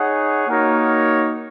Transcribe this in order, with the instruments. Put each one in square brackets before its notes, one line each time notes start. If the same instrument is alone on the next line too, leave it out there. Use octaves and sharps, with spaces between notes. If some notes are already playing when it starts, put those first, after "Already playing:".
Already playing: [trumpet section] D#4 G#4 C#5 F#5
A#3 D#4 F#4 A#4 C#5